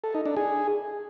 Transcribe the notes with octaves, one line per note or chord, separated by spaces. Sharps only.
A4
D#4
D4
G#4